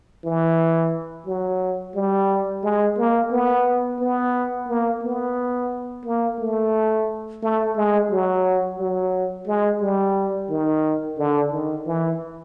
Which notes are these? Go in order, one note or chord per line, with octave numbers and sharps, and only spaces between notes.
E3
F#3
G3
G#3
A#3
B3
B3
A#3
B3
A#3
A3
A3
G#3
F#3
F#3
G#3
G3
D#3
D3
D#3
E3